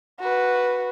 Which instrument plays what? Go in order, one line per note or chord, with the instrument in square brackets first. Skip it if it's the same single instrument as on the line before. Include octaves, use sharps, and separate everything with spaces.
[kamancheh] F#4 B4